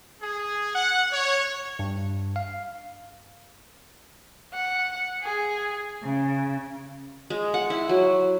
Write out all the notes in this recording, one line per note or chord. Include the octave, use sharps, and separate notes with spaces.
G#4
F#5
C#5
G2
F5
F#5
G#4
C#3
G#3
F#5
E4
F#3